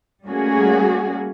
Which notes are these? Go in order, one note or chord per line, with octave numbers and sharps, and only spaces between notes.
G3 A3 A#3 C#4 F#4 G#4